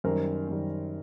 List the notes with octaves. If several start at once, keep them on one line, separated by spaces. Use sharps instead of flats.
F#2 D#3 G3 A#4 C5
F#2 D#3 G3